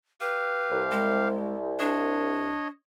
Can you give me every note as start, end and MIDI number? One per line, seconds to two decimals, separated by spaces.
0.21 1.28 67
0.21 0.83 71
0.21 1.28 77
0.71 2.58 36
0.91 1.56 56
1.79 2.68 62
1.79 2.68 73
1.79 2.68 75